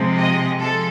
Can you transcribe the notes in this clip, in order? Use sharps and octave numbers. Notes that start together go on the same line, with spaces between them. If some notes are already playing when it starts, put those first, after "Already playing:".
Already playing: C3 F3 G#3
D#5
F3 G#3 A4